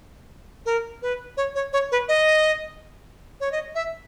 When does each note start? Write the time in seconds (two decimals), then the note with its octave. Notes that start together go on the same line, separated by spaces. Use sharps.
0.66 A#4
1.02 B4
1.37 C#5
1.55 C#5
1.73 C#5
1.92 B4
2.09 D#5
3.40 C#5
3.52 D#5
3.75 E5